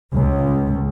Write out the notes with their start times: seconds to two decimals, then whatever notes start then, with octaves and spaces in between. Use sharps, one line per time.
0.13 C#2